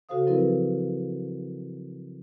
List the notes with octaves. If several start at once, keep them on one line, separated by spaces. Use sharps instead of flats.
C#3 F#4 A4 C5 F5 D#6
F3 F#3 C4 E4 A#4 B4